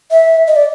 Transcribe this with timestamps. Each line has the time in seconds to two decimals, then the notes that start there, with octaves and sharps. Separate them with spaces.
0.11 E5
0.48 D#5
0.56 D5